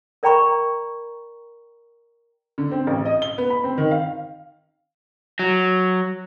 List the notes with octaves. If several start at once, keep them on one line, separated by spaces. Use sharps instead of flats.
A#4 D5 G5 A#5 B5 C#6
D3
C4
A1
D#5
G7
B3
B5
C4
D#3
F5
F#3